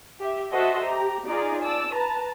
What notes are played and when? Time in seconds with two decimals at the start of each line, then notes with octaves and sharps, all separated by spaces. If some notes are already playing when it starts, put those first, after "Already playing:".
0.21 G4 E5
0.53 F#4 A4 C5 D#5 E5 F#5
0.84 G4 A#5
1.28 D#4 F4 G#4 D5 A#5
1.61 D5 A5 E6
1.94 B4 A5 A#5